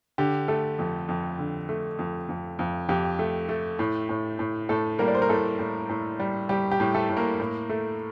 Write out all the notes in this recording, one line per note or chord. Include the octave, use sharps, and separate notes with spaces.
D3 G4
A3 A4
F2
F2
D3
A3
F2
F2
F2
F2 G4
A3
A3
A2
A2
A2
A2 A3 A4
G3 A#3 A#4
D5
C5
A#4
A2 A3 A4
A2
A2
G3
G3 G4
G4
A2
A3 A4
A2
A#3 A#4
A2
A3